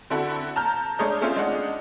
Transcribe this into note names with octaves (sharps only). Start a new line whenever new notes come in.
D3 C4 E4 F#4 A4
A5 A#5 F6 G6
G#3 A3 D4 C#5 D#5 G6
A3 C4 C#4 F4 C5 E5
G#3 D4 D#4 F#5